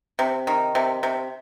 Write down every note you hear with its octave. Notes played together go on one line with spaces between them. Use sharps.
C3
D#3
C3
C3